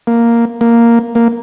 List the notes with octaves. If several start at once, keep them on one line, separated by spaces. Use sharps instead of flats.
A#3
A#3
A#3